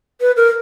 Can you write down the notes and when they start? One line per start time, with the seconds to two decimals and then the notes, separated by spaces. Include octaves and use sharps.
0.21 B4
0.37 A#4